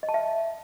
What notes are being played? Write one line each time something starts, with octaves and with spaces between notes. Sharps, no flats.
D#5
A5
E5